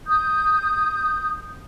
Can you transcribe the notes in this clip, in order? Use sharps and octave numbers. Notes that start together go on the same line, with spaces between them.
D#6 G6